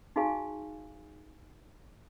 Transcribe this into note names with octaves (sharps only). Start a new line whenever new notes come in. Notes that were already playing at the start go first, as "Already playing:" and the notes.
D#4 F#4 G#4 F5 G#5 C#6